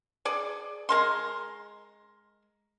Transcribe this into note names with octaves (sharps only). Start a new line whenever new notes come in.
G#4 D5
G#3 A#4 C6